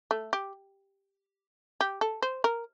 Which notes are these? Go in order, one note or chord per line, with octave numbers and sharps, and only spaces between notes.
A3
G4
G4
A4
C5
A#4